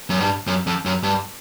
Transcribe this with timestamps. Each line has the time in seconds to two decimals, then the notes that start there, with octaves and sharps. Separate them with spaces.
0.10 F#2
0.19 G2
0.47 F#2
0.67 F2
0.85 F#2
1.03 G2